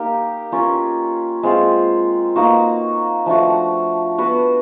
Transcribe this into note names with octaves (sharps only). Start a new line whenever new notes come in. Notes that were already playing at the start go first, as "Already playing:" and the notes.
Already playing: A#3 D#4 G4 A#4
C#4 F4 A#4 C#5
G#3 C4 F4
A#3 D#4 F#4
F3 A3 D4 F#4
B3 D4 F#4 B4